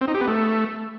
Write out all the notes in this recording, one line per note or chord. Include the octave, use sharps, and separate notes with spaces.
C4
D#4
G4
B3
A3